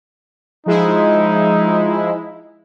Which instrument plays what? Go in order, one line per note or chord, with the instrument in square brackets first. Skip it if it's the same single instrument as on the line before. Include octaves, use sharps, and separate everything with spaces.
[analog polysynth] F3 G#3 E4 [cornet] D#4